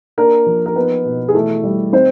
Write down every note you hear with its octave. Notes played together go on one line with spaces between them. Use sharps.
A#3 D4 A#4
F3
A#4
B3 D#4 B4
B2
G#4
E3 A3 A4
G3
C4 D#4 C5